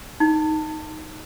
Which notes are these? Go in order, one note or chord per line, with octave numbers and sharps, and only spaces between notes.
D#4